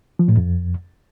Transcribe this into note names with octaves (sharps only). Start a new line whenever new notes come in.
F3
A2
F2